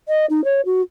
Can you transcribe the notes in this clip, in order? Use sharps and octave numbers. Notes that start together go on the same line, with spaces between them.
D#5
D#4
C#5
F#4